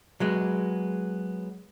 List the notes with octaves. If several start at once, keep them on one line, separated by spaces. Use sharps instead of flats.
F#3 G#3 B3